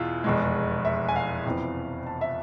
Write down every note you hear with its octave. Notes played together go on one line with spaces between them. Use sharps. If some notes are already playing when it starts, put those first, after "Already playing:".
Already playing: E2 B2 E4 F4
F1 E2 B2 G#3
E5
G#5
F5
F2 C3 E3 B3
A5
E5